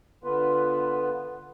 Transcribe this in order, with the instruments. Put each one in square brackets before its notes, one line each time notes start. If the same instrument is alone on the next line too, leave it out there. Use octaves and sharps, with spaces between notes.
[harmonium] D3 B3 F4 B4